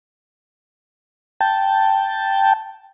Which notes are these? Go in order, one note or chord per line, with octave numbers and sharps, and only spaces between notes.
G5 A5